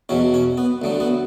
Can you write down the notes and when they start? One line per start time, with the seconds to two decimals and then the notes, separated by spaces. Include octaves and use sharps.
0.09 E2 B2 F#3 C#4
0.34 C#4
0.58 B3
0.82 D2 D3 F#3
1.00 B3